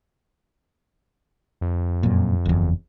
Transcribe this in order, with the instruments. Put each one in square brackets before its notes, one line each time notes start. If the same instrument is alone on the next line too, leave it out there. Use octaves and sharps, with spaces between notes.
[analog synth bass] F2
[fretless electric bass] F#2 A#2
F#1 E2